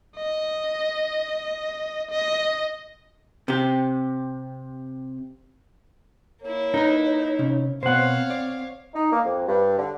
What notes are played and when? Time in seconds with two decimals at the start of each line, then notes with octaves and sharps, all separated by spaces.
0.16 D#5
2.10 D#5
3.48 C3 G4
6.42 A#3 E4 C#5
6.74 D#4 A#4 B4 A#5
7.39 C3 C#4
7.83 B2 B3 C4 C5 C#5 F5 F#5
8.30 D5
8.94 D#4
9.11 A#3
9.25 F2
9.47 G2
9.78 D3